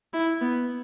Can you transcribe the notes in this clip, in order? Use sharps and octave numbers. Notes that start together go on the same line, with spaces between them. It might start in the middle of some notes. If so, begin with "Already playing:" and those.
E4
B3